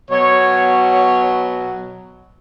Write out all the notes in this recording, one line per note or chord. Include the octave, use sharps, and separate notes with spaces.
B2 F#3 C#5
C#5